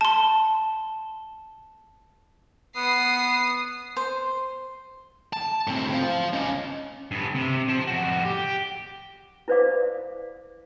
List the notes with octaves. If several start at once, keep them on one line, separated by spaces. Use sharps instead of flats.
A5 C6
B3 D#6 C7
C5
A5
A2 C4
C5 F5
C#4 D#5
G2 B3
C3
C5 A5
F2 F#4
G4
E4 B4 C5 D5 F5 D6